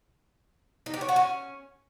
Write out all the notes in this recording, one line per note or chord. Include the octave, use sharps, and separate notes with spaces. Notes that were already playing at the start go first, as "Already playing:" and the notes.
D#4
G4
C#5
F#4
C#4